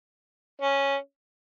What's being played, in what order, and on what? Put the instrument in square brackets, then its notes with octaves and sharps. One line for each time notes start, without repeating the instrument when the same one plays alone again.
[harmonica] C#4